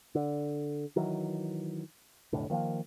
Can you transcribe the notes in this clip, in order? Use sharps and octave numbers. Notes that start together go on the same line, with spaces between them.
D3
D#3 E3 F#3
F1 B1 A2 D3
D#3 F3 A#3